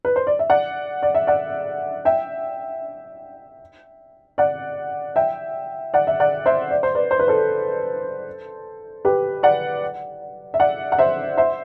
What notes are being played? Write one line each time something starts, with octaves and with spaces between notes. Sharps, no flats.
B4
C5
D5
E5
D5 F#5
D5
E5
D5 F#5
E5 G5
D5 F#5
E5 G5
D5 F#5
E5
D5 F#5
C5 E5
D5
C5
B4 D5
C5
B4
A4 C5
G4 B4
D5 F#5
E5
D5 F#5
F#5
C5 E5
C5 E5